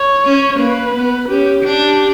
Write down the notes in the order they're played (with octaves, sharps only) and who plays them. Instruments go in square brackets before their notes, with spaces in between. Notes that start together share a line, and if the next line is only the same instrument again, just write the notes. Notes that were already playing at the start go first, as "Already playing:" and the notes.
Already playing: [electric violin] C#5
[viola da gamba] C#4
[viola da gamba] A#3 [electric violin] B4
[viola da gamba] B3
[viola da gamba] C#4 [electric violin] G4
[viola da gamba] D4 [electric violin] G4